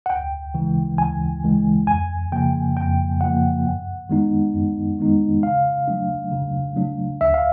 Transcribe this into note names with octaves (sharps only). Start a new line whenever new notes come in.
F#5
D2 G5
C#3 E3 G#3
D2 G#5
C#3 E3 G#3
F2 G#5
C#3 F3 A#3 G5
F2 G5
C#3 F3 A#3 F#5
F#2
D#3 G#3 B3 D#4
F#2
D#3 G#3 B3 D#4
C#3 F5
F#3 A3 D4
C#3
F#3 A3 D4
D2 E5
F5